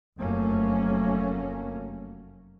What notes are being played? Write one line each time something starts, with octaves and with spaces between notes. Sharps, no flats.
F1 F#2 F#3 A3 A#3 C#4